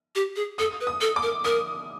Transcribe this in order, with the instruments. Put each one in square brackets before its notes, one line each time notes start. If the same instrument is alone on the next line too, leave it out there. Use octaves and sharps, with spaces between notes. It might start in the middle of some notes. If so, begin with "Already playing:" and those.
[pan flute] G4
G#4
[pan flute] A4 [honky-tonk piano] D#6
[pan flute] B4
[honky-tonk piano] D#6
[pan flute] A4
[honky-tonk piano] D6
[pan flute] A#4
[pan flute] A#4 [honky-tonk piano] D#6